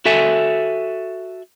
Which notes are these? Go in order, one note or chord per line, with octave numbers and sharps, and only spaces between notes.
F#4 A4 E5 G#5